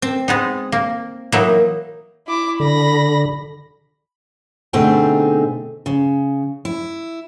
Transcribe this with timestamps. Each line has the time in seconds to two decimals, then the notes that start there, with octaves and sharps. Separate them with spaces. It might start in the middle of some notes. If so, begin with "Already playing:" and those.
0.02 C4
0.28 G#3 B3 D#4
0.72 A#3
1.32 E3 F#3 A#3 D#4
2.27 E4 D6
2.60 D3 B5 A#6
4.73 B2 D3 A3 C4 D#4 G#4
5.86 C#3
6.65 E4